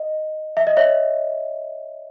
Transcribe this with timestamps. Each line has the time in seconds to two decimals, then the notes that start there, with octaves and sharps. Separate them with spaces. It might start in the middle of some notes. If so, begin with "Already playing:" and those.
Already playing: D#5
0.57 E5
0.67 D#5
0.77 C#5 E5